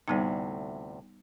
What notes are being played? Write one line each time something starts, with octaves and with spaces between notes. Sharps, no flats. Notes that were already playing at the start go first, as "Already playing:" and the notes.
D2 A2 C3 G3 B3 D#4